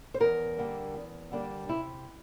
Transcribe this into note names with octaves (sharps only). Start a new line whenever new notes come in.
C5
E2 A#4
D3 G3 A#3 D4
E2
D3 G3 A#3 D4
C3 E4